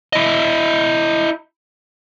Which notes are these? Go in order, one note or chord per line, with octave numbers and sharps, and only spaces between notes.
E4 D#5